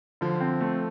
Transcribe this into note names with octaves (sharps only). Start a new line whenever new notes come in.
D3 F3
C4
A3